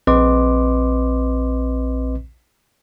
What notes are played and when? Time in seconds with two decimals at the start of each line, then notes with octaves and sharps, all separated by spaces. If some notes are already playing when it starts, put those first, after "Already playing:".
0.07 A#1 C4 B4 D#5 C6 D6